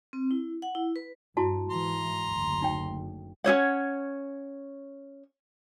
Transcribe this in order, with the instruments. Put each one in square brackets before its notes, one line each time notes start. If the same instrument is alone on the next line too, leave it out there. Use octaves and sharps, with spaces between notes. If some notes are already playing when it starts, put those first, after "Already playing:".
[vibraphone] C4
E4
F#5
E4
B4
[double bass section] G2 [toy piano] E4 F#4 A5
[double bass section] G#2 E3 [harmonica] A#5 C6
[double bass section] F#1 D2
[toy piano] D#4 G5
[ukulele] C#4 F4 C#5 F#5